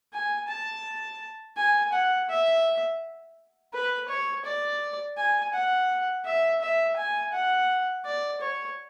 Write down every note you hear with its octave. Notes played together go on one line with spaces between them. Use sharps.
G#5
A5
G#5
F#5
E5
B4
C#5
D5
G#5
F#5
E5
E5
G#5
F#5
D5
C#5